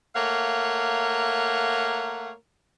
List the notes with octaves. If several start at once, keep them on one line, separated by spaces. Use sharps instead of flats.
A3 A#3 A#4 C#5 F5 F#5